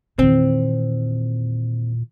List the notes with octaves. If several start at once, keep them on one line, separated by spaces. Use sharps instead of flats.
E2 A#2 D#3 C4